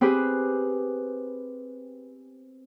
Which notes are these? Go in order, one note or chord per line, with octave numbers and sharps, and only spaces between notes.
C4 G4 G#4 B4 C5